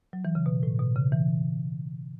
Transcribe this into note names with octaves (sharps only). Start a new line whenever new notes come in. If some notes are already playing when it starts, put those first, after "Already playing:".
F#3
E3
C#3
B2
A2
B2
C#3
E3